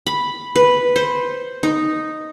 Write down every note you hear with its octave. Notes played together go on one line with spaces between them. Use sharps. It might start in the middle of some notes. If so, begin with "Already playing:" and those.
B5
B4
C5
D#4